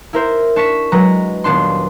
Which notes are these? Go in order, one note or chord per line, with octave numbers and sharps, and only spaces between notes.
E4 A#4 C5
D4 C#6 B6 E7
F#3 G#3 B4 A#5
D#1 B3 D4 C6